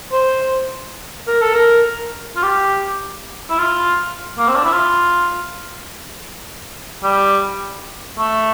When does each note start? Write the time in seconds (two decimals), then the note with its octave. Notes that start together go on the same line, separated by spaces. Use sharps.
0.12 C5
1.27 A#4
1.41 A4
1.54 A#4
2.36 F4
2.43 G4
3.50 E4
3.58 F4
4.38 A#3
4.47 C4
4.56 D4
4.64 E4
4.72 F4
7.03 G3
8.18 A3